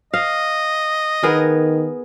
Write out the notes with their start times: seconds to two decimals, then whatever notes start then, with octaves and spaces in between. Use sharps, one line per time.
0.14 D#5 F5
1.23 D#3 B3 G#4 A#4